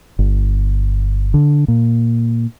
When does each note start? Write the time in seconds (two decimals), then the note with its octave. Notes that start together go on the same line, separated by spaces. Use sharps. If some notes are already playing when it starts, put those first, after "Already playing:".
0.19 G1
1.34 D3
1.68 A#2